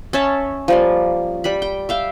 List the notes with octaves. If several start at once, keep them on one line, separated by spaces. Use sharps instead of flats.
C#4 C#5 E5 A5
F3 G3 A#3
G3 B5
G5
E5 F5 G5